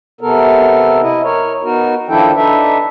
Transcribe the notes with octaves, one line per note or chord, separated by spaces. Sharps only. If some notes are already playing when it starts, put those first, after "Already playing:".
C3 B3 A4 A#4
E4 D#5
A#4 C#5
B3 D#4 F#4 A#4
D#3 F3 D4 E4 A4 G5
D4 D#4 A4 B4 E5